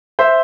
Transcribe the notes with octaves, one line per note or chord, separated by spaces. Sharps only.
C5 E5